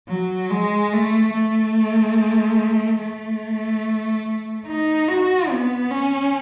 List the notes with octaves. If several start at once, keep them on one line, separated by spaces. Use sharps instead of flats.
F#3
G#3
A3
A3
A3
D#4
F#4
B3
C#4